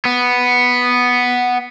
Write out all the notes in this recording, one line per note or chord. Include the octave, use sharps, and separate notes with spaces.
B3